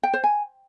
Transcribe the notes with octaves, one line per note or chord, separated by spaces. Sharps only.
G5
C5
G#5